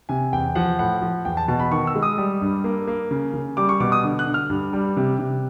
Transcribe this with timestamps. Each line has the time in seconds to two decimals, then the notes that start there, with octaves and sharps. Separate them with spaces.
0.09 C3 G#5
0.33 E2 G5
0.55 F3 F#5
0.79 A2 F#5
1.02 F3
1.25 E2 G5
1.37 A5
1.48 B2 A5
1.60 B5
1.71 D#3 C#6
1.87 E6
1.95 G#3
2.03 D#6
2.18 G3
2.41 G2
2.64 A#3
2.87 A#3
3.11 C#3
3.34 C#3
3.57 G3 D6
3.69 C#6
3.80 B2 D6
3.92 D#6
4.04 D3
4.19 F#6
4.26 D3
4.34 F6
4.50 G2
4.73 G3
4.97 C3
5.19 C3